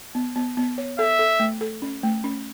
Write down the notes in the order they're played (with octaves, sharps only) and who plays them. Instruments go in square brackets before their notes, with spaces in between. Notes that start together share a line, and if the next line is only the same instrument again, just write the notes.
[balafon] B3
B3
B3
C#5
[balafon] A4 [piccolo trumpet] E5
[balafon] A4
A3
A4
C#4
A3
C#4